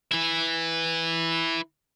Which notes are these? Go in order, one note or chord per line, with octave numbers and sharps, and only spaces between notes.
E3 E4